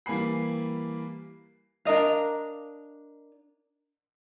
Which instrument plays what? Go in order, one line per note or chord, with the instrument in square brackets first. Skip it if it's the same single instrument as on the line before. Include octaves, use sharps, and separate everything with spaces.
[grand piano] E3 G3 A#3 G#5 B5 C7
[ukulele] D4 A#4 D#5 F5